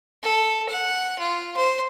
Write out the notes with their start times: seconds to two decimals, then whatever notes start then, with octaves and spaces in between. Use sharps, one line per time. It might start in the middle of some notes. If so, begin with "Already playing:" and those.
0.23 A4
0.69 F#5
1.19 F4
1.57 C5